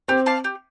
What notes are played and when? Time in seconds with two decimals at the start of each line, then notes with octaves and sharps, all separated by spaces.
0.08 C4 G4
0.26 D5 F5 A5
0.44 G4